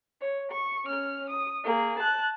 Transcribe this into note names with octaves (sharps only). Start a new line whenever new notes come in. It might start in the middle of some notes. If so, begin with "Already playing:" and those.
C#5
C#6
C#4 F6
D#6
A#3 G#4
A5 F#6